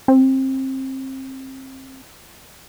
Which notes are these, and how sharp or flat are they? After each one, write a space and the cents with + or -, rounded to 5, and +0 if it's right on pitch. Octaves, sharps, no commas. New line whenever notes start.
C4 +25